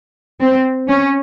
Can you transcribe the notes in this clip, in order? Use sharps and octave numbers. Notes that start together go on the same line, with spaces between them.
C4
C#4